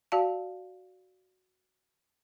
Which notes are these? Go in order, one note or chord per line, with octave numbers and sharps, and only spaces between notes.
F#4 D5 F5 A5